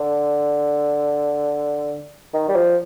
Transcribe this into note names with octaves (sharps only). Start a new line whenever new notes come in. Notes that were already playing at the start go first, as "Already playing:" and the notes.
Already playing: D3
D#3
G3
F3